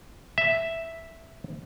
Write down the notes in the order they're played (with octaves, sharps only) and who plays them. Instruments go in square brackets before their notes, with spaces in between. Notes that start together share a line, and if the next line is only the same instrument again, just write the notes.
[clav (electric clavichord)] E5